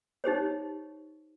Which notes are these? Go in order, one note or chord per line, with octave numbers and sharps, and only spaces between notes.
D#4 G4 C5 C#5